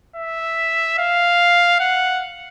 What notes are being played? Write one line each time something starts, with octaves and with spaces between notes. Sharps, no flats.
E5
F5
F#5